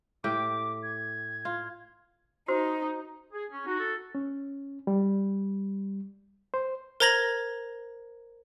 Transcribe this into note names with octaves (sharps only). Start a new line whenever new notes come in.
A2 G4 G5 D6
G#6
F4
D#4 F#4 C5
G#4
C#4
D#4 F#4
A4
C#4
G3
C5
A#4 C5 A#5 G#6 A#6 F#7